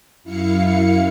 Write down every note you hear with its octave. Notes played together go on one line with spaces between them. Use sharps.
F#2 E4 F5 C#7